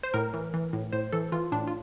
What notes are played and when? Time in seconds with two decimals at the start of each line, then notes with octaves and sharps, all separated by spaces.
0.03 C5
0.14 A2 A#4
0.34 E3
0.54 E3
0.73 A2
0.93 A2 C5
1.12 E3 A4
1.32 E3 F4
1.52 A2 D4
1.68 F4